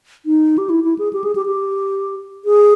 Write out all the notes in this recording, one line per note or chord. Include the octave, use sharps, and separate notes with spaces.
D#4
G4
E4
E4
G#4
G4
G#4
G4
G4
G#4